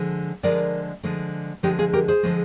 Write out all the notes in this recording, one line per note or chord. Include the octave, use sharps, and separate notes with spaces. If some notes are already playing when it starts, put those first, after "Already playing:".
Already playing: D3 F3 G#3
D3 F3 G#3 A#4 D5
D3 F3 G#3
D3 F3 G#3 D#4 G4
F4 G#4
G4 A#4
G#4 C5
D3 F3 G#3